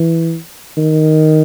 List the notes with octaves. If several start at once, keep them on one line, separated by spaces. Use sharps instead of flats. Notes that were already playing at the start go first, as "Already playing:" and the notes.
Already playing: E3
D#3